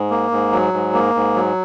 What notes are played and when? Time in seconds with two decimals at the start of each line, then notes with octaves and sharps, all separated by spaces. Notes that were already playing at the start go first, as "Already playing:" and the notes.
Already playing: G#2
0.10 A#3
0.31 G#2
0.52 F#3
0.73 G#2
0.93 A#3
1.15 G#2
1.35 F#3